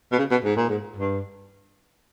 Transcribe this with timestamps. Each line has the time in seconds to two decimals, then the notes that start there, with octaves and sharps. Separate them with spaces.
0.12 B2
0.18 C#3
0.31 B2
0.45 G#2
0.56 A#2
0.69 G#2
0.96 G2